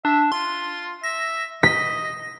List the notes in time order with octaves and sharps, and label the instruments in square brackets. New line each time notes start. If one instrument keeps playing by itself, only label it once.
[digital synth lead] D4 [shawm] E5
[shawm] F4 [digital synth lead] C6
[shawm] E5 [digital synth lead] A#6
[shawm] D#5 [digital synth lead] A#6 [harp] B6